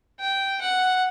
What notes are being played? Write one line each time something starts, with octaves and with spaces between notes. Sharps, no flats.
G5
F#5